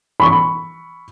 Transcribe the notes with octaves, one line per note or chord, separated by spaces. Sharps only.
B5 C#6